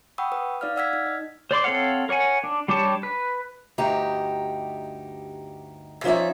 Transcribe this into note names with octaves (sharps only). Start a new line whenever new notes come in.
F#5 G5 B5 C#6 D#6 E6
B4 D#6
D#4 D5 F5 F6
D5 F#5 E6 F6 G#6 B6
D#4
D#5
C5 D5 C6 D6
C4 A4 C#5 F5 F#5
A#4 C#5 F#5 G#5
D4
G3 D4 G4 C#5 A5
B4
D2 G2 D#4 G4 A#5
F3 C#4 D#4 D5 E5